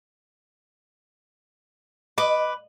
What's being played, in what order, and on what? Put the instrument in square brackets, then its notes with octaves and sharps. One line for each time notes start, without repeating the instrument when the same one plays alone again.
[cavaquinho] B4 D6 [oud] D#5